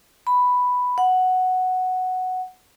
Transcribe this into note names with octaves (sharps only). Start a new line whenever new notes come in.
B5
F#5